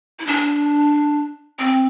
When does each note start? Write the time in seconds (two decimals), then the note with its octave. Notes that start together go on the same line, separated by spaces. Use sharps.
0.19 E4
0.27 D4
1.59 C4